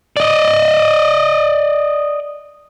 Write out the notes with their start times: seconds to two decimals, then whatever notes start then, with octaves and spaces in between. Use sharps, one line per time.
0.17 D5 D#5